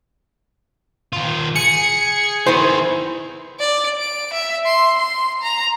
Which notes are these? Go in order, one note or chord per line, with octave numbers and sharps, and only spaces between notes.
D#3 F4
G#4 C#7
D#3 E4 G#4 B4 C5
D5
D7
E5
C6
C6
A#5